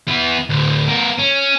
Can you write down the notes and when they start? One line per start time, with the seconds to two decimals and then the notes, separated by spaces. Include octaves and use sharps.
0.08 E3 B3
0.49 D2 A2
0.87 B3 A#4
1.18 C#4